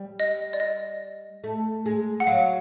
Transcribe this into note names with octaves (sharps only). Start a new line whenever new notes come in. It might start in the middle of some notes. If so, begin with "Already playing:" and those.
Already playing: G3
D#5
D5
D#5
A3
G#3
F#5
F#3 F5